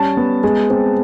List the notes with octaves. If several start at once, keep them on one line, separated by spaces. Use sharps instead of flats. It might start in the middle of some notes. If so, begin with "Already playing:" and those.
Already playing: G3 C#4 A5
B3
G#3
C4